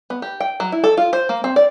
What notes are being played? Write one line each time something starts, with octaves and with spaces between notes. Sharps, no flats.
B3
G4
G5
F#3
E4
A4
F4
C5
A#3
C4
D5